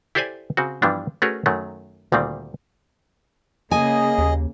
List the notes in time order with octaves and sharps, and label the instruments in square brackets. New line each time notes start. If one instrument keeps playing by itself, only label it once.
[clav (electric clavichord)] E4 G4 A4 C5 D5 G#5
C#3 C4 F#4
G2 E3 F3 G3 B3 D4
A3 C#4 F#4 G#4 A#4 B4
F#2 D#3 F#3 A3
D2 A#2 D#3 G3 C4
[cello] C#3 A#3 [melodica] G#4 D#5 [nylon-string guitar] G#5
[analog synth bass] D#2